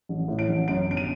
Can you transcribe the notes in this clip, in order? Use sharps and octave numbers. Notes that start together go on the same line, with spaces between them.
A1
A2
D7
A1
F#2 D7
G1 D7
D#7